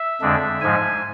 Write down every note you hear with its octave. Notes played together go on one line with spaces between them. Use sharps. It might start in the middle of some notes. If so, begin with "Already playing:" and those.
Already playing: E5
F2 D3 G#3 D4
G#2 F3 G#3 G#5